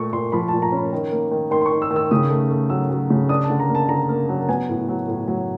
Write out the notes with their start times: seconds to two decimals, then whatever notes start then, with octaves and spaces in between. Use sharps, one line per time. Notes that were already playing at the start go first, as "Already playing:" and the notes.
Already playing: A#2 A3 C#6
0.13 A#2 C6
0.32 F3 B5
0.48 A5
0.53 A#2
0.62 A#5
0.72 C#4 B5
0.93 D#3
1.12 A#3
1.31 D#3
1.51 D#3 C6
1.61 C6
1.66 C#6
1.72 D#3
1.82 E6
1.91 D#3
1.96 E6
2.11 C#3 D#6
2.30 A3
2.51 A3
2.70 F#3 E6
2.90 F#3
3.10 C#3
3.29 D4 D#6
3.44 A5
3.50 D3
3.60 A#5
3.69 A#3
3.75 A5
3.89 D3 A#5
4.09 A#3
4.29 F#3
4.49 B3 G#5
4.69 A2
4.89 F#3
5.08 A2
5.28 F#3